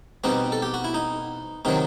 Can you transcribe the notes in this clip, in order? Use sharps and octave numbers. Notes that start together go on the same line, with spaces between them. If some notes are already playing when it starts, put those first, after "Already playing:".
B2 G3 C4 D#4 F#4
A4
G4
F#4
E4
D#4
C3 D#3 F#3 C4 D#4